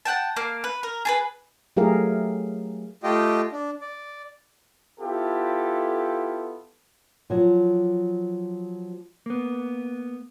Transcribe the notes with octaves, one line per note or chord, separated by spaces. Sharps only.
F#5 G5 A5
A#3 F5
B4
A#4
G#4 A4 B4
F#3 A3 G4 G#4 A#4 F5
A3 F4 G4 D#5 G5
D4
D5
B3 E4 F4 G4 A4
F3 F#3
A#3 B3